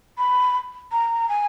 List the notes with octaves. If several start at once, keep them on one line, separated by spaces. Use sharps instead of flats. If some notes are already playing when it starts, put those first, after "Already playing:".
B5
A#5
G#5